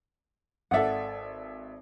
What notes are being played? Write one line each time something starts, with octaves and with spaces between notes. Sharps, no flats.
G#1 A4 D5 E5 F#5